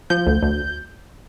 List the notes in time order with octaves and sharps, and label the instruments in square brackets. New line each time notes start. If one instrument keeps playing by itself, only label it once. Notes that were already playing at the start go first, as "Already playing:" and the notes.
[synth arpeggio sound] F3 G6
D2
D2